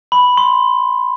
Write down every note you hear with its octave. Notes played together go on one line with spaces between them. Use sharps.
B5
C6